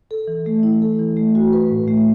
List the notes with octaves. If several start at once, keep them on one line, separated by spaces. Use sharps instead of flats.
A4
E3
A3
E4
A4
E3
A3
F#4
B4
A2
A3